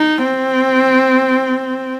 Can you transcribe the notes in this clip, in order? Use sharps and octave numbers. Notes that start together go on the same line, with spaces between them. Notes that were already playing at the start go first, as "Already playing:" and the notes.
Already playing: D#4
C4